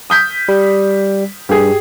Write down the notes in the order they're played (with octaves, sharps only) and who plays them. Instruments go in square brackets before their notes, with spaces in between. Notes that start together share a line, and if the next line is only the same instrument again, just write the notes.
[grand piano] D#6 G6 B6
[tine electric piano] G3
[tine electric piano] G2 [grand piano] G4 G#4